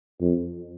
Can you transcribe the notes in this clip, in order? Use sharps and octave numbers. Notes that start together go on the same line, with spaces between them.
F2